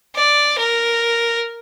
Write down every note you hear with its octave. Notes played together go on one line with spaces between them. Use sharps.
D5
A#4